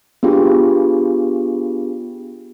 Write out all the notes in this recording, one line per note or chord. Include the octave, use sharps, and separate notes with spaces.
B3 D4 F4 G4 G#4